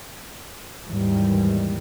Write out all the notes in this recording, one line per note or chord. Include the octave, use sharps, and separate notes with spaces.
D#2 G#2 E3 G3